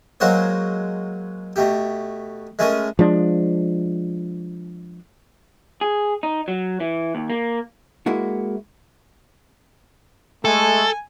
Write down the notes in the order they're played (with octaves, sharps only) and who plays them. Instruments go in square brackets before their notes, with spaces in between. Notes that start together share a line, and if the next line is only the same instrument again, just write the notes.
[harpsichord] F#3 G#3 A#3 F#4 C5 C#5
B2 A3 G4
G#3 A3 C#4 G#4 A#4
[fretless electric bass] F3 G#3 D4
[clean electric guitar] G#4
D#4
F#3
E3
D#2
A#3
[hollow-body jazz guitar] G#3 A#3 E4 F#4
[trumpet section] G#3 A3 [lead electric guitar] A4 [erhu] G#5